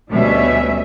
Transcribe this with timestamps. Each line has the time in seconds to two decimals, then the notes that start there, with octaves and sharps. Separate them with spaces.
0.10 D2 B2 G3 C#4 E5